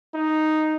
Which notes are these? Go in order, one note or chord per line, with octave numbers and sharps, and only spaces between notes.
D#4